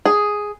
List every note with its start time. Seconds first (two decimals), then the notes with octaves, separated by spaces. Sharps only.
0.06 G#4